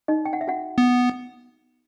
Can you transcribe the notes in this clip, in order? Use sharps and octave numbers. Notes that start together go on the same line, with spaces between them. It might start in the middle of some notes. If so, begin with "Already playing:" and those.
D#4 D#5
G5
F#5
E5
F#4 F#5
B3